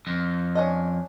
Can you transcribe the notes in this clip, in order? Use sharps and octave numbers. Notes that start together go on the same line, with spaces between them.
F2
C#4 D4 D#5